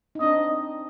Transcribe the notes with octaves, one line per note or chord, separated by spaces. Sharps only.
D#4
C4 D4 D#5